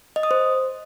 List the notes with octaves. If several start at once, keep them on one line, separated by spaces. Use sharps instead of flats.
D#5
D#6
C5